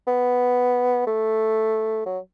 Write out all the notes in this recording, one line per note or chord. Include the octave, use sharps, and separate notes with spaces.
B3
A3
F#3